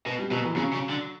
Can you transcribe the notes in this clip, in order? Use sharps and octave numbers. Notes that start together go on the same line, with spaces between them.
B2 B3
G3
B2 F#3
E3
C#3 F#3
C#3
D3